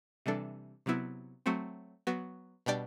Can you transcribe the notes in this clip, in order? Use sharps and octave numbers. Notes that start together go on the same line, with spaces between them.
C3 E3 G3 D4 A4
C3 F#3 B3 E4
F#3 A3 C4 F#4
F#3 B3 F#4
B2 G3 D4 G4 D5